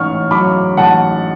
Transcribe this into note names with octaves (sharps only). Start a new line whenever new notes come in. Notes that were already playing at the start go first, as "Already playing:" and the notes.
Already playing: A1 G#2 C#6 F6
F#3 B5 D6
A1 F#5 A5